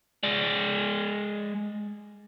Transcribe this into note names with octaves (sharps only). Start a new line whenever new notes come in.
G#3 D5